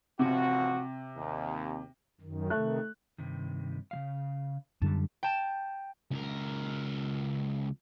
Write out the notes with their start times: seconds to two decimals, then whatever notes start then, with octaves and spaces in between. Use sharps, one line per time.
0.19 A1 C3 F3 F#4
1.16 D#2
2.21 F#2 D#3
2.50 C3 D#3 A3 F#6
3.18 G2 C3 D#3
3.91 C#3 G3 F5
4.82 F#2 D3 G3 A5
5.23 G5 A5 E7
6.11 C#2 A#4